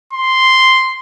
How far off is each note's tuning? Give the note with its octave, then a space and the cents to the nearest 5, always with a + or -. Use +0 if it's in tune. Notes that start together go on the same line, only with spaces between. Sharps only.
C6 -5